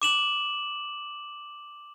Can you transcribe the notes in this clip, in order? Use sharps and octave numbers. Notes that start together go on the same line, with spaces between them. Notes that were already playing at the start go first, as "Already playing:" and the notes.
D6 E7 F#7